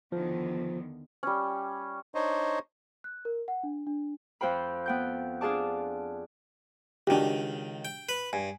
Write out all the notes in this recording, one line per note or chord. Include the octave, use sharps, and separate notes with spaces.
E2 D3 D#3 F3
G3 C#4
D4 D#4 C5 C#5 D#5
F#6
A#4
F#5
D4
D4
F2 F4 C5 G5 B5
B3 G5 G6
D4 F4 G#4 D5 A5 D6
C#2 D#3 D4 F#4 G4
G5
B4
G2 G#5